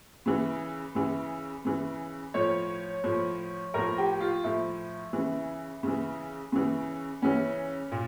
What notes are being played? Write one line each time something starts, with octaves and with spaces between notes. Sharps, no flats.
C#3 E3
C#3 E3
C#3 E3
A2 F3 C#5
A2 F3
A2 F3 A#4
G4
F4
A2 F3 E4
C#3 E3
C#3 E3
C#3 E3
C#3 E3 C#4
A#2